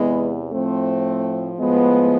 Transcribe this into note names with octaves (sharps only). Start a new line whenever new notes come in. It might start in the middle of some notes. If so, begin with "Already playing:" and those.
Already playing: E2 C3 E3 G#3 B3
A2 F3 A3 C4
A2 F3 G#3 B3